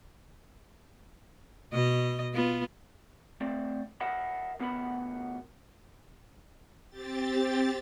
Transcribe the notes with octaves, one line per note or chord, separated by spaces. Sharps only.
B2 D#5
B3 F4
A3 C4 D5
A#4 D#5 E5 F#5 A5 B5
D2 B3 A#4 F#5 B5
C4 G4 A6